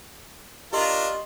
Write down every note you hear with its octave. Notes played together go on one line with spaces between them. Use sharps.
D4 F4 G4 A#4 D#5 C6